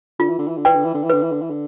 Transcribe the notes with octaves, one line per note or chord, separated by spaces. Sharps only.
D3 F4
E3
D3
E3
D3
E3 B4 D5 G5
D3
E3
D3
E3
D3 B4
E3
D3
E3
D3